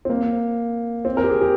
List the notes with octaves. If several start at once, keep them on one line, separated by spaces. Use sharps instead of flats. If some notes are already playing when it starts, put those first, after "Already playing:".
C4
A#3
C4
A#4
G4
G#4
G4